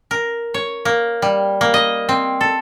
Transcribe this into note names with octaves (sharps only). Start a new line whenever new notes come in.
A#4
C#5
A#3
G3
A#3
D#5
C4
A4